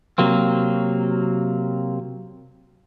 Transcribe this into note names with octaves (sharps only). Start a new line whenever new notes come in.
C3 F#3 A#3 C4